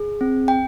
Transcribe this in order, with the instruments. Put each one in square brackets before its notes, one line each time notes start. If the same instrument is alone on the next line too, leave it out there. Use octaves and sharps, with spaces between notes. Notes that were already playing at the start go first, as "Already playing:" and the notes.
Already playing: [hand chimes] G#4
C4
G5